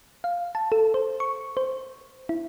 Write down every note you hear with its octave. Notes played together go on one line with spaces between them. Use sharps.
F5
A5
A4
C5
C#6
C5
E4